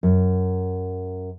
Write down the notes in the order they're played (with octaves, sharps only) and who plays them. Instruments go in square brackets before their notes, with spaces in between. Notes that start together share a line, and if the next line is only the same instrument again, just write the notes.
[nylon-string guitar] F#2